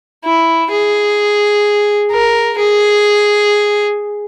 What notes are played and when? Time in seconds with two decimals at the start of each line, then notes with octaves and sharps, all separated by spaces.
0.25 E4
0.71 G#4
2.11 A#4
2.58 G#4